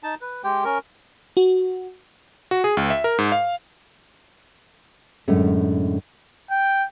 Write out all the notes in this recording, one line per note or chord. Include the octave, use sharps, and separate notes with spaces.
D#4 A5
B4
G#3 G4 G5
C#4 A#4
F#4
F#4
G#4
C#2
E5
A#4
G#2
F5
F#2 A2 D3 G#3 A3 C#4
G5